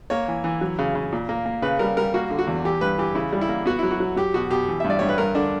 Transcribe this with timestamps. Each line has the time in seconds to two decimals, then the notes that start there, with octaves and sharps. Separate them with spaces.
0.10 A#3 C#5
0.28 E3
0.44 E3
0.61 F#3
0.79 C#3
0.95 C#3
1.12 A#2
1.29 A#3
1.46 A#3
1.62 C#3 B4
1.79 G3 A#4
1.97 G3 A#4
2.14 A#3 F#4
2.30 D3
2.39 F#4
2.47 E2
2.64 E3 G4
2.81 G2 B4
2.98 E3 G4
3.15 C#3 E4
3.33 G3
3.41 E4
3.49 A#3
3.66 B3 F#4
3.79 F#3 E4
3.91 F#4
4.00 F#3
4.16 F#3 G4
4.34 B2 F#4
4.50 B2 G4
4.68 E3
4.80 G2 E5
4.90 D5
4.99 G2 C#5
5.09 B4
5.18 G2 A#4
5.35 D3 D4